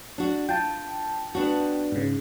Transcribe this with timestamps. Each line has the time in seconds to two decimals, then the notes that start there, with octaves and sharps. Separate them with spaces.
0.18 D4 F#4
0.49 F4 G5 A5
1.35 B3 D4 F#4
1.92 G#2 C#3